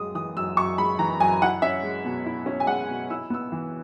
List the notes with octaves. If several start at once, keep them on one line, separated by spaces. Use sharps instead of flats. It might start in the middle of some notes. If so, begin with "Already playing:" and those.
Already playing: F#2 G#3 D#6
E3 D#6
F#2 E6
F#2 C#6
G#3 B5
E3 A#5
F#2 G#5
E4 F#5
C#4 E5
G#3
B2
E4
C#4
G#5
G#3 F#5
B2
E4 E6
B3 E6
E3